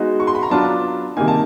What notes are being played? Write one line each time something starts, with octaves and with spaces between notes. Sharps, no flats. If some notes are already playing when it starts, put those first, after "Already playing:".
Already playing: G#3 B3 D#4 F#4
C#6
C6
B5
A#5
F#3 B3 D4 F4 A5
C3 D#3 G3 A#3 D#4 G#5
A5